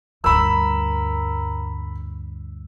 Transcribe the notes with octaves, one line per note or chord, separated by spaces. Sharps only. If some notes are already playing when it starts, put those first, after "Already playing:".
D2 G2 A#4 B5 E6